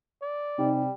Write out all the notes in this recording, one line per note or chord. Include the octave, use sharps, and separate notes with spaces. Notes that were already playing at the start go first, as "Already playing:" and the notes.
D5
C3 G3 D#4